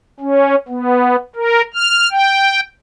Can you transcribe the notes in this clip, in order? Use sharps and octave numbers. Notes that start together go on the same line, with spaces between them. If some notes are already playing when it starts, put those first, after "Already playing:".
C#4
B3
A#4
F6
G5